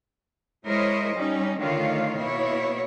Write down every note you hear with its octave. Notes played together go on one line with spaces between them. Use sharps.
G#3 E4 A#4 C5 C#5 D#5
G3 C#4 D#4
D3 D#3 A3 F4 C#5 F5
B2 A#3 E4 C#5